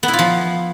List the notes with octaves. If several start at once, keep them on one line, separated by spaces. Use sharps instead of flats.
B3
E4
F4
F3